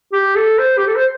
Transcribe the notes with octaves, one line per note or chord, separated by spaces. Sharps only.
G4
A4
C5
G4
A4
C5